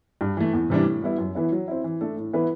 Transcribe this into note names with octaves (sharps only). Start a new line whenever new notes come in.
G2
E3 A3
E2
C3 E3 G3 D4
A2
G3 B3 E4
F#2
E3 B3 E4
F#3
C4 E4
E3
A3 D4 A4
A2
E3 B3 E4 B4